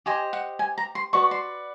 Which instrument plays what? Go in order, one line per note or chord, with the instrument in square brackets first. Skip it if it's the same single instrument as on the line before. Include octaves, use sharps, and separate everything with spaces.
[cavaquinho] G4 C5 D#5 G#5
F#5
G#5
A#5
C6
F#4 B4 D5 C#6
C6